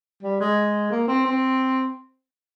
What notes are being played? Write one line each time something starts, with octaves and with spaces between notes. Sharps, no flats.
G3
G#3
A#3
C4
C4